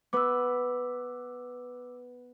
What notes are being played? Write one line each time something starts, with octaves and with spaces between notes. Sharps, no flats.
B3 B4 D6 E6